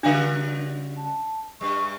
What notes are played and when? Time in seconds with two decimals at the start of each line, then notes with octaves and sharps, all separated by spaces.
0.03 C#3 G3 D4 F#4 F5
0.97 A5
1.61 G2 G3 C#6